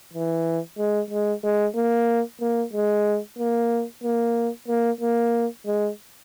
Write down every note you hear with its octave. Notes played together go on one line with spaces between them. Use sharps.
E3
G#3
G#3
G#3
A#3
A#3
G#3
A#3
A#3
A#3
A#3
G#3